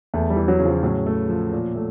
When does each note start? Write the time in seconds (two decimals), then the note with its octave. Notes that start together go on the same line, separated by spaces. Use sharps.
0.14 E2 A3
0.30 G3
0.36 E3
0.48 F#3
0.59 C#3
0.65 F3
0.83 A2 F#3
1.06 A3
1.28 F3
1.52 A#2
1.76 A3